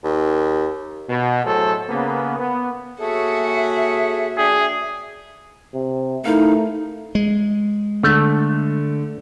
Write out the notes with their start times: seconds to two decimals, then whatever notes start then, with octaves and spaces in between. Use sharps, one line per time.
0.04 D#2
1.09 B2
1.45 A2 F#3 A3 G#4 A4 C5
1.89 C#3 A#3 B3
2.39 B3
3.00 A#3 F#4 G#4 A4 C#5 E5
4.38 D4 G#4 G5
5.74 C3
6.26 A3 D#4 E4 A#4 F5
7.15 G#3
8.03 D3 A3